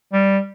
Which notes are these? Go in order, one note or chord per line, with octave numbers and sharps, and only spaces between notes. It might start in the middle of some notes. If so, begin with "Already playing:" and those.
G3